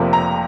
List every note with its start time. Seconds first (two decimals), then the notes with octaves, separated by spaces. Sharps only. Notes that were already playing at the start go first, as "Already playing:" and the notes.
Already playing: F1 F2 C3 F3 A#3
0.13 A#5